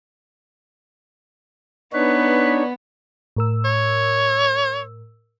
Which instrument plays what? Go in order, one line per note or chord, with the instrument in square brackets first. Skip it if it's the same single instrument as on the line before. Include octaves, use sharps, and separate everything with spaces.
[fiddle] B3 [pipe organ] D4 D#4 C#5 [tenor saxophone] B4
[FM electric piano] A2 A#4 E6
[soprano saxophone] C#5